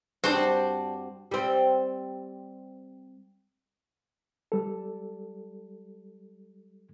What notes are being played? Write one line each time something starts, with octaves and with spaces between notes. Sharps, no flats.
G2 C4 D4 F#4 G#4 C5 D5 A5
G3 C4
G3 A4